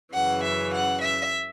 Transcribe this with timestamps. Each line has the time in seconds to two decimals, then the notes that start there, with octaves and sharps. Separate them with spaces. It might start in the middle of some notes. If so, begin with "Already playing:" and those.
0.13 F#2 C#3 E3 F#5
0.44 E5
0.74 F#5
1.03 E5